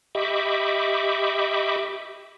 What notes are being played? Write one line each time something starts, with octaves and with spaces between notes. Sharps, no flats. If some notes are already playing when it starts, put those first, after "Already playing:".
G4 D#5 E5 B5 C#6 D6